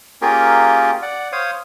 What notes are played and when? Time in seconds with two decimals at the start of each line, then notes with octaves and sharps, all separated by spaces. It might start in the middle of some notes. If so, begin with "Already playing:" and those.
0.22 A#3 C#4 F4 G4 G#4 A#4
1.02 D5 F#5
1.32 C5 C#5 F5 D#6